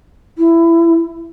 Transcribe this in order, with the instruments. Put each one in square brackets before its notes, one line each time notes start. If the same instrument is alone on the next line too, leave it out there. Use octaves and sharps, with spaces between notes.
[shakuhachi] E4